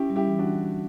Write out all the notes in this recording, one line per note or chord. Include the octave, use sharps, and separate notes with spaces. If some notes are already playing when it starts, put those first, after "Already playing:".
Already playing: C#4 E4 G4
G3
E4 G4
E3
D4 F#4